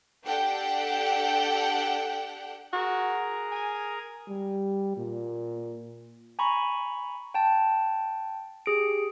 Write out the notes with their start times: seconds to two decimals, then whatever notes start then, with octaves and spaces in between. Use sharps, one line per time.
0.24 D4 G4 A4 F#5 G5
2.73 F#4 G#4 A#4 A#5
3.52 G#5
4.28 G3
4.97 A#2
6.39 G#5 A#5 B5 C#6
7.34 G5 A5
8.66 G4 G#4 D7